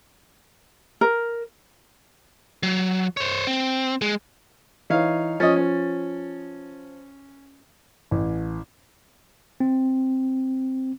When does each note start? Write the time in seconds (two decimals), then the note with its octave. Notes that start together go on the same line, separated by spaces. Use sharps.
1.01 A#4
2.63 F#3
3.17 C5 C#5
3.47 C4
4.02 G#3
4.90 E3 D#4 C#5 F5
5.40 F3 C#4 D#5 A6
5.56 C#4
8.11 A1
9.60 C4